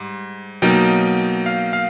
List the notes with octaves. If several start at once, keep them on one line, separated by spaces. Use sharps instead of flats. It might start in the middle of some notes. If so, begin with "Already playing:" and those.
Already playing: G#2 G3
B2 F#3 A#3 D#4 G5
F5
F5